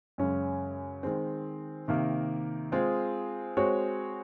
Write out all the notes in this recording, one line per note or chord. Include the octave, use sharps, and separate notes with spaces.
F#2 C#3 G#3 C#4
D#3 G#3 C4
C3 D#3 A#3
G#3 C4 F4 G#4
G#3 C4 F#4 C#5